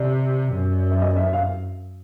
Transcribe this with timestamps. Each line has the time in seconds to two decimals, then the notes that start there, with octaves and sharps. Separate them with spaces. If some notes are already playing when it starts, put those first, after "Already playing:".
Already playing: C3 D5
0.53 F#2
0.91 E5
1.02 D#5
1.17 E5
1.33 F5